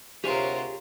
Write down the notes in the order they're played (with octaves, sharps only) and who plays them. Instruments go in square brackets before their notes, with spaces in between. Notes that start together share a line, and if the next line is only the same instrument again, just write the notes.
[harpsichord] D2 C3 F#3 [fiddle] F4 A#4 [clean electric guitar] G4 G#4 C#5